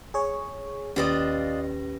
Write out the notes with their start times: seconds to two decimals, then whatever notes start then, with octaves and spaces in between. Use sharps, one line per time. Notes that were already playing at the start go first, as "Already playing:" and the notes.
0.14 G#4 C#5
0.96 D#2 C#4 D4 F4 G4 B4 D#5 A#6